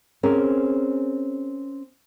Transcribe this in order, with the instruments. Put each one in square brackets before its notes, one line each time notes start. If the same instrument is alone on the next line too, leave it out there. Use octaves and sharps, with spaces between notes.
[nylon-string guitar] C4 C#4 G#4 A#4